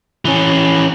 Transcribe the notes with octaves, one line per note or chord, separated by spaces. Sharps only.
E3 C#4